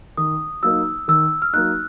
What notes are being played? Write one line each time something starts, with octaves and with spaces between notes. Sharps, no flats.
D#3 D#6
F#3 A#3 D#4 E6
D#3 E6
F6
F#3 A#3 D#4 F#6